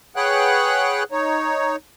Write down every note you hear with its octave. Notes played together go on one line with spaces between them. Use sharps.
G#4 B4 C#5 F#5 G5 F#6
D#4 C#5